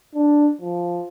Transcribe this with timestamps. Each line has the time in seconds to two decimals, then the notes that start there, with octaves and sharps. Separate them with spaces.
0.15 D4
0.61 F3